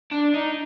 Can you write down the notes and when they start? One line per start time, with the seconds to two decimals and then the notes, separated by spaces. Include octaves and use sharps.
0.11 D4
0.34 D#4